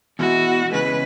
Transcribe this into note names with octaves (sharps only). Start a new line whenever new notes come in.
E2 B2 G#3 E4 F#4
E2 C#3 G#3 B4